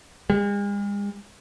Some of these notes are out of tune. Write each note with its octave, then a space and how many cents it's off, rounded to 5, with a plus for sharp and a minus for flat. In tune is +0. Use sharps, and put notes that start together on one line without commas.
G#3 -45